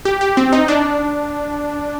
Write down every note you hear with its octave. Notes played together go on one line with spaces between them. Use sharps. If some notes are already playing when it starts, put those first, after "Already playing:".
G4
G4
C4
D#4
D4